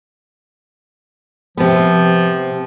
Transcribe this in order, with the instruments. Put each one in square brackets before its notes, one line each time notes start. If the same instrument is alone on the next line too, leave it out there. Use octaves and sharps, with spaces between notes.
[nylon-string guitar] C3 B3 [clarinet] F3